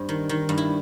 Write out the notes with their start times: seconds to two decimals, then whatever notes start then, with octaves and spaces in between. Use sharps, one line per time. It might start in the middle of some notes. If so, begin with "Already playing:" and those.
Already playing: G2 C4
0.09 D#3
0.29 D#3
0.49 G2
0.58 E4